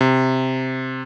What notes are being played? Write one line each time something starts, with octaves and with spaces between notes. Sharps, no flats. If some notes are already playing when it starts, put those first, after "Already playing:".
C3